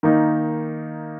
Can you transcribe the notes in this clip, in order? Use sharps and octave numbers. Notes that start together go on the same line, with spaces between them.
D#3 A#3 D#4